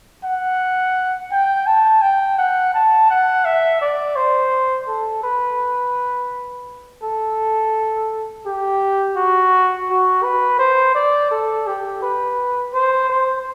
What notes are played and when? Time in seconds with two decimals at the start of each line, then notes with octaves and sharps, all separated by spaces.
0.24 F#5
1.31 G5
1.67 A5
2.02 G5
2.38 F#5
2.74 A5
3.10 F#5
3.45 E5
3.81 D5
4.16 C5
4.87 A4
5.23 B4
7.02 A4
8.46 G4
9.16 F#4
9.89 F#4
10.23 B4
10.59 C5
10.95 D5
11.31 A4
11.67 G4
12.02 B4
12.74 C5
13.09 C5